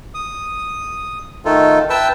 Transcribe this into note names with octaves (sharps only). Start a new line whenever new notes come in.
D#6
D#3 A3 D#4 F4 A4
B4 E5 G5 A5 E6